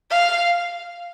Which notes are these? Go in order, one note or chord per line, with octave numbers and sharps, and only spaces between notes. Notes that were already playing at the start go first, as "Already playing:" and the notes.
F5